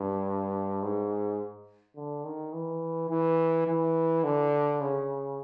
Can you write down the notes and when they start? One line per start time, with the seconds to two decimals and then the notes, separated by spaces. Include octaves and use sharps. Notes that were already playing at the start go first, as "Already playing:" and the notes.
Already playing: G2
0.83 G#2
1.96 D3
2.24 D#3
2.53 E3
3.10 E3
3.67 E3
4.24 D3
4.81 C#3